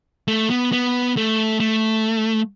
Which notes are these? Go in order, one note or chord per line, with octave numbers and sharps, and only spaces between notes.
A3
B3
B3
A3
A3